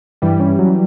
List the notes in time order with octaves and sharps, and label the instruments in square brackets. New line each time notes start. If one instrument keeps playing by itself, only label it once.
[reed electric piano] G2 [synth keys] E3 G3
[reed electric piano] C#4
F#3